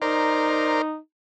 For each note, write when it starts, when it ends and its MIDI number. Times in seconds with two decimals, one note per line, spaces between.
0.02 0.97 63
0.02 0.82 70
0.02 0.82 72
0.02 0.82 74